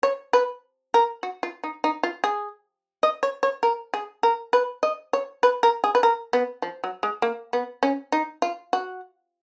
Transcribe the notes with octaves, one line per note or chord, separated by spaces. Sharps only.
C#5
B4
A#4
F#4
F4
D#4
D#4
F4
G#4
D#5
C#5
C#5
A#4
G#4
A#4
B4
D#5
C#5
B4
A#4
G#4
B4
A#4
B3
F3
F#3
G#3
A#3
B3
C#4
D#4
F4
F#4